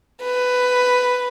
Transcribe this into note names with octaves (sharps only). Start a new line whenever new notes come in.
B4